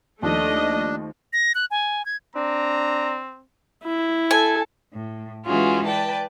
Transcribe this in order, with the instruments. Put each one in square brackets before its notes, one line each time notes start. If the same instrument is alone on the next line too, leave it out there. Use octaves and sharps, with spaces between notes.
[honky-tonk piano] D#2 F3 [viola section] A3 D#5 [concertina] D4
[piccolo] A#6
F#6
G#5
G#6
[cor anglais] C4 [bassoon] D4 [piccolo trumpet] A#5
[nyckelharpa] E4
[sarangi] A4 [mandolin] G#5
[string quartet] A2
E3 G#3 C#4 F4 F#4 G#4
B4 D5 G5 A5